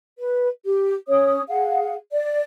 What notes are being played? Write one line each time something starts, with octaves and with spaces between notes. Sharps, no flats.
B4
G4
C#4 C#5 D#6
G#4 F5 F#5
D5